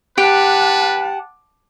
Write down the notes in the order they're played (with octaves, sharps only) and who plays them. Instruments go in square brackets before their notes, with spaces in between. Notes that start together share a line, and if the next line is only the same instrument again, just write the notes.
[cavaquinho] G4 [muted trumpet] B4 [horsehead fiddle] F#5 A5